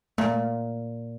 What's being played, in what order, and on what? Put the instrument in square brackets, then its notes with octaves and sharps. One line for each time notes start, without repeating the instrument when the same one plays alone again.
[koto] A#2 [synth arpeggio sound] A3